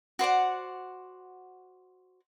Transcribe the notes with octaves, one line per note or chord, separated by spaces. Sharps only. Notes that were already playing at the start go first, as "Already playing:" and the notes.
F#4 C5 D5 F#5